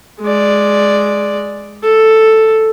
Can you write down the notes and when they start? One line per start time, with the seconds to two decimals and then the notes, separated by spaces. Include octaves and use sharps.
0.21 G#3 D5
1.84 A4